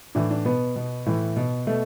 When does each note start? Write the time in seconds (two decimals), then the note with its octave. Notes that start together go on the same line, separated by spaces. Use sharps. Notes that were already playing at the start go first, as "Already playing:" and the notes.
0.15 A2 E3 D4
0.31 D4
0.45 B2 B3
0.76 B2
1.06 A2 E3
1.36 B2
1.67 B2 A3